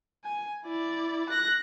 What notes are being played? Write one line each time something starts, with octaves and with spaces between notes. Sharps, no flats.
G#5
E4 D5
F#6 A#6